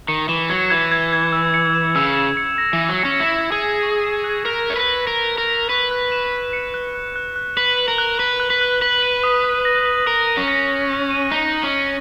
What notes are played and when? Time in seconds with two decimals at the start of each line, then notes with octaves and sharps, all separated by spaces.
0.08 D#3 C#7
0.29 E3 E7
0.50 F#3 G#6
0.70 E3 G#6
0.92 G#6
1.13 G#6
1.32 E6
1.54 C#7
1.75 E7
1.96 C#3 E6
2.16 E7
2.37 C#7
2.58 A#6
2.73 E3
2.78 A#6
2.89 F#3
2.99 C#7
3.05 C#4
3.20 E4 C#7
3.41 E6
3.52 G#4
3.62 E6
3.83 C#6
4.04 E7
4.24 F#6
4.45 A#4 B6
4.66 C#5 B6
4.76 B4
4.87 B6
5.07 A#4 B6
5.29 B6
5.38 A#4
5.49 B6
5.69 B4 C#6
5.91 F#6
6.12 E7
6.32 F#6
6.53 C#7
6.74 F#6
6.95 F#6
7.16 F#6
7.36 F#6
7.57 B4 F#7
7.78 F#7
7.88 A#4
7.98 F#6
8.19 B4 F#7
8.40 F#6
8.50 B4
8.61 F#6
8.82 B4 F#7
9.02 D#7
9.23 D#6
9.44 D#6
9.65 A#6
9.86 F#7
10.06 A#4 D#6
10.27 D#7
10.37 C#4
10.48 A#6
10.69 A#6
10.90 A#6
11.11 D#7
11.31 D#4 B6
11.52 F#7
11.63 C#4
11.73 D#7